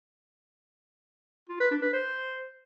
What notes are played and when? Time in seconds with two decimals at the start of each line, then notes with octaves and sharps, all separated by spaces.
1.49 F4
1.60 B4
1.71 D4
1.82 B4
1.93 C5